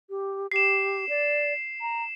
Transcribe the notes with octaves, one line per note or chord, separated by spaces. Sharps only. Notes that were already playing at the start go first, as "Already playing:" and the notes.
G4
G4 C7 E7
D5
A#5